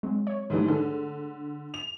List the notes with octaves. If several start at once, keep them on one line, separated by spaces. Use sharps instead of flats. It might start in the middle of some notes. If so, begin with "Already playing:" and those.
F#3 G#3 C4
C#5
G#2 E3 G3 A3 D4
D3 D4 G#4 A4
F7